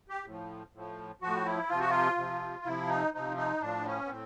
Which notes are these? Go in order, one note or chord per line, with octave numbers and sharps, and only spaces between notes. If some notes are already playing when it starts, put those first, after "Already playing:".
G4
A2 F3
A2 F3
A2 F3 F#4
E4
C3 F3 F4
F#4
F4
C3 F3
C3 F3 E4
D#4
C3 F3 D#4
D#4
A2 F3 D4
C#4
B3
A2 C4